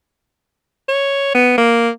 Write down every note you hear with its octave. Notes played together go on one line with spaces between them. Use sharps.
C#5
B3
A#3